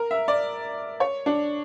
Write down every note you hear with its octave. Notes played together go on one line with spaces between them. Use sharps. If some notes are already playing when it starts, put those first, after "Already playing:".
Already playing: A#4
E5
D5
C#5
D4